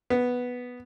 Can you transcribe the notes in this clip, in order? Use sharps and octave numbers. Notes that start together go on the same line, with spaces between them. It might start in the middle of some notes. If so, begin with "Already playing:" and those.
B3